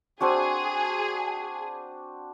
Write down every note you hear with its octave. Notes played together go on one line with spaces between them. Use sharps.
C4 D4 F#4 G#4